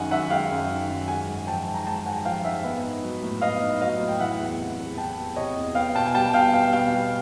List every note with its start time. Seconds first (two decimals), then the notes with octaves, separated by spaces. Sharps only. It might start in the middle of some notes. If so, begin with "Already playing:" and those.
Already playing: F#2 D#3 G#3 F#5 G#5
0.11 F#2 E5 F#5
0.30 G#3 F5 G5
0.51 F#2
0.69 D#3
0.90 F#2
1.08 G#3 F#5 G#5
1.27 G#2
1.47 F3 G5 A5
1.66 G#2
1.74 A#5
1.86 G#3 G5 A5
2.05 G#2 F#5 G#5
2.25 F3 F5 G5
2.44 G#2 E5 F#5
2.64 B3
2.84 D#4
3.03 F#3
3.23 A2
3.41 B3 D#5 F5
3.62 D#4
3.80 F#3 D#5 F5
4.00 A2
4.08 G5
4.19 E3 E5 F#5
4.40 E2
4.59 C3
4.79 E2
4.97 E3 G5 A5
5.18 E2
5.36 C3 C#5 D#5
5.57 E2
5.75 B3 F5 G5
5.95 B2 G5 A5
6.06 G#5
6.14 G3 G5 A5
6.33 B2 F5 G5
6.53 B3 F5 G5
6.73 B2 F5 G5
6.92 G3